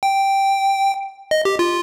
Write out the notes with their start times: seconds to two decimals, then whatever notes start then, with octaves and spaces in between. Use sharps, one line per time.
0.03 G5
1.31 D#5
1.45 G4
1.59 F4